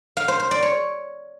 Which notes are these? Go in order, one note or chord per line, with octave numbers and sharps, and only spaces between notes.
F5
C5
C5
D5
C#5